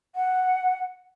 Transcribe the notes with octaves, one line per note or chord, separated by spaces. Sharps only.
F#5